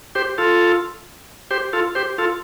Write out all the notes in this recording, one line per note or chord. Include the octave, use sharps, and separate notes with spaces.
G4 C5
F4 A4
G4 C5
F4 A4
G4 C5
F4 A4